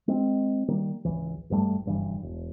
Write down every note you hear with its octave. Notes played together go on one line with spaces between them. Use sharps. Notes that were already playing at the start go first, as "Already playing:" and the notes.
G#3 C4
D#3 G3 A#3
G#1 C#2 E3
G#1 G2 G3 A3
F#1 G2 E3
E1